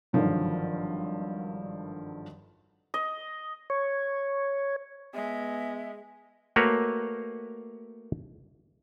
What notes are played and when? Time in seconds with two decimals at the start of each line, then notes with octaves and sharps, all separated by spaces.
0.13 G#1 G2 D3 D#3 F3 F#3
2.94 D#5
3.70 C#5
5.14 G#3 B3 E5
6.56 A3 A#3 F#4 A#4 B4 C#5